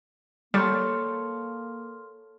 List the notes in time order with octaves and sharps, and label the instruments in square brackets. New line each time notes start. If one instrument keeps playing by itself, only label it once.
[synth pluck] G3 [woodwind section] A#3 [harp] A4 C#5 A5 [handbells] C6 F6